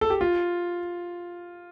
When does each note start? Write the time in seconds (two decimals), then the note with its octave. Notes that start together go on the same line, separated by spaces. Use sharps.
0.01 A4
0.10 G4
0.21 F4